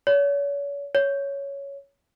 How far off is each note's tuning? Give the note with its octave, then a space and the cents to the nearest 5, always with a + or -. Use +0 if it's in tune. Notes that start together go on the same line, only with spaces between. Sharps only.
C#5 +40
C#5 +10